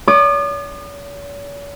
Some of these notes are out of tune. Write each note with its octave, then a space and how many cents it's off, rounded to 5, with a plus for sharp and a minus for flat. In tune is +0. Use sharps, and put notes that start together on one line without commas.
C#5 +45 D#6 -45